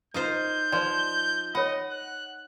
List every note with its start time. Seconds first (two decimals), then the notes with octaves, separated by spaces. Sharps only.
0.14 D#4 F4 C5 G6
0.72 F3 D5 C6
1.55 C#5 D#5 F#5 B5
1.90 F#6